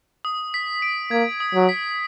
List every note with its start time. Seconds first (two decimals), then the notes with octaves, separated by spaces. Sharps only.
0.25 D#6
0.54 B6
0.82 D7
1.11 A#3 G#6
1.40 D#6
1.54 F#3
1.69 B6